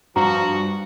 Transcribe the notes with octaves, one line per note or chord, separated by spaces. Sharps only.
G2 F3 F#4 A#5